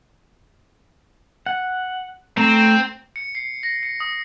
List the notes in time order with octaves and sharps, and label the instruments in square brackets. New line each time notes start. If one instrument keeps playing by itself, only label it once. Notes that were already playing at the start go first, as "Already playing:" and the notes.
[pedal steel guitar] F#5
[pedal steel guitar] A3 A#5 [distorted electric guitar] C4
[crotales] C#7
C7
A#6
C#7
D#6